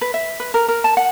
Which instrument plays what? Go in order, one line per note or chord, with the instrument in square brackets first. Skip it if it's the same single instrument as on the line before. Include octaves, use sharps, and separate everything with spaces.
[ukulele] B4
E5
B4
A#4
A#4
A5
F#5